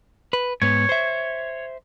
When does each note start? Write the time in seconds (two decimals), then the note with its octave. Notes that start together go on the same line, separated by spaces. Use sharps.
0.33 B4
0.62 G#2 B3 C#5
0.89 C5 E5